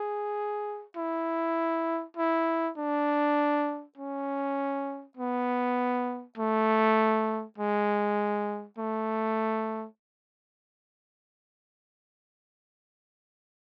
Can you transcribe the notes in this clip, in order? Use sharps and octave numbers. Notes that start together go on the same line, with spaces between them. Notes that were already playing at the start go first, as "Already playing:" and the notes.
Already playing: G#4
E4
E4
D4
C#4
B3
A3
G#3
A3